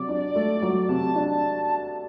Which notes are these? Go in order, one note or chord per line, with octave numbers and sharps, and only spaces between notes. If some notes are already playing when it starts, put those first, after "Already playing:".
Already playing: C3 F#3 D5
D4
A3
F#3
C3 A5
D4